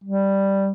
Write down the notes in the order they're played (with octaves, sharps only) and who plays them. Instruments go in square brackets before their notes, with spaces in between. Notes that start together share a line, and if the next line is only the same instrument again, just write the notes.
[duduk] G3